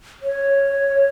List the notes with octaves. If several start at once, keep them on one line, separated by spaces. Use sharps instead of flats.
C#5